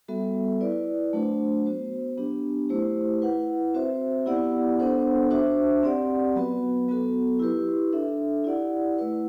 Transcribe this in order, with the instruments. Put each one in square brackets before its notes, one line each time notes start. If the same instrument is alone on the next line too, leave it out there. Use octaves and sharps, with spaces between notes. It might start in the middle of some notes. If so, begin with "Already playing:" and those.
[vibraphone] G3 B3 F#4 A4 E5
E4 B4 D5
F#3 A3 D4 F#4 C5
B3 F#4 C5
F#3 B3 D4 G4
A3 E4 G4 C5
E4 B4 F#5
C4 F#4 C5 E5
B3 E4 G4 D5 F#5
B3 D4 A4 C5 F#5
D4 F#4 C5 E5
C4 G4 D5 F#5
F#3 B3 F#4 B4
F#3 B3 F#4 A4
E4 G4 B4
D4 A4 E5
E4 G4 D5 F#5
A3 E4 B4 F#5